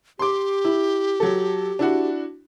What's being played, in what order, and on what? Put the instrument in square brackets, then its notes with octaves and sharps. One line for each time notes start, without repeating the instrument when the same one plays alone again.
[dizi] G4 [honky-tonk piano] C6 D6
[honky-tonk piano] E4
F#3 A4
D4 E4 F#4